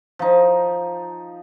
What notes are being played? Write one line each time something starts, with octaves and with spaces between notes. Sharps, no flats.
F3 D#4